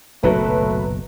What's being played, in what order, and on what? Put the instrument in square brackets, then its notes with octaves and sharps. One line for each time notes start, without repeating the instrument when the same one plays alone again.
[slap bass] F#1 B1 A#2 [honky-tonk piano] F#3 B4 [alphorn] A3